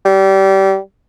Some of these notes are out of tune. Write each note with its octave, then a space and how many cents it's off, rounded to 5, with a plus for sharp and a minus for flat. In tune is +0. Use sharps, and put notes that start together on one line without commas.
G3 -25